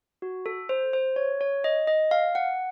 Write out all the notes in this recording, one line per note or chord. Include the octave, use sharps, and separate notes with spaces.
F#4
A4
C5
C5
C#5
C#5
D#5
D#5
F5
F#5